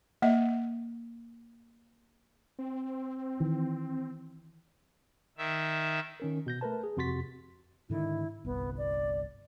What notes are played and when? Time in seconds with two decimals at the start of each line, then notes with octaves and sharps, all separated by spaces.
0.22 A#3 D#5 E5
2.59 C4
3.40 D#3 E3
5.38 D#3 E5
6.20 D#3 C#4 A#4
6.46 B2 G6 A#6
6.61 A3 A#4 B4 A5
6.83 G#4
6.97 F2 C3 F#4 C6 A6 B6
7.90 G#2 D3 D#3 E4
8.45 G1 C2 B3
8.78 D5